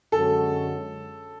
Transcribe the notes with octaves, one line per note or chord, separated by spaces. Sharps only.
F#2 D3 G#3 C#4 F#4 A4